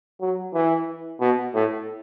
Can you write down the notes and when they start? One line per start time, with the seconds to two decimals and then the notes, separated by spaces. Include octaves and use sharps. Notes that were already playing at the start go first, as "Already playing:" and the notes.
0.21 F#3
0.54 E3
1.20 B2
1.54 A2